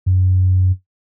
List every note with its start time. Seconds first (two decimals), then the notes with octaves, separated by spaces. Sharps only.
0.06 F#2